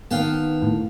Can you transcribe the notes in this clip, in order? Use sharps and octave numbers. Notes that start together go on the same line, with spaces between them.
D#3 B3 F5 G5 A5
A2